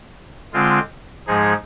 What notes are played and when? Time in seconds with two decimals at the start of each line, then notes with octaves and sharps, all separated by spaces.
0.53 D3 G#3 C4 F4
1.27 G#2 F3 G#3 D#4 G#4